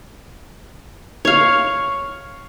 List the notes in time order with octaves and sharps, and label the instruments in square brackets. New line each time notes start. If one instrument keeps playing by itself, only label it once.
[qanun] C#5 F5